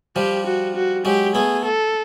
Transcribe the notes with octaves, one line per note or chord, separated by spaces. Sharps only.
F3 G3 G4
F#4
F#4
F#3 G#3 G4
A3 B3 G#4
A4